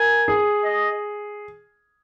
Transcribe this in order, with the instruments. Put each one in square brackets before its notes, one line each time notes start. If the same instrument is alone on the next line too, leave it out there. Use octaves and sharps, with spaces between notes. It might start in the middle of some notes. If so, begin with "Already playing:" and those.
Already playing: [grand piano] A#4 [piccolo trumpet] G#5
[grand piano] G#4
[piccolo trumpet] D#5